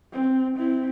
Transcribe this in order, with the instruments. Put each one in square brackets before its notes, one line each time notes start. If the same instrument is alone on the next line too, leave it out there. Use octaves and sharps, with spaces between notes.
[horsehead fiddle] C4
C4 E4